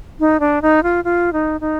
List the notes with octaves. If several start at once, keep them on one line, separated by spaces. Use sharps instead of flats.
D#4
D4
D#4
F4
F4
D#4
D#4